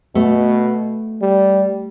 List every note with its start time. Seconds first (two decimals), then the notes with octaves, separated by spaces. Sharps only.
0.15 B2 A3
1.22 G3